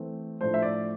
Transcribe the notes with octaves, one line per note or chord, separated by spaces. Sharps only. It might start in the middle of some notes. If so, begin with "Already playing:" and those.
Already playing: E3 A3 C4
A2 F3 A3 D4 C5
E5
D5